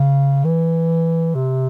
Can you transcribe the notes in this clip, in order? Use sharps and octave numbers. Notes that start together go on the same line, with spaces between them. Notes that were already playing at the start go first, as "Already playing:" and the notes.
Already playing: C#3
E3
C3